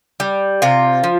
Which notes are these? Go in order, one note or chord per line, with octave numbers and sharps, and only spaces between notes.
G3
C3 F4
F3